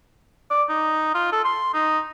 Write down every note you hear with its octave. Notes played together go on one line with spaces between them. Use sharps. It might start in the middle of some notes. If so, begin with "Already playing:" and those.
D5
D#4
F4
A4
C6
D#4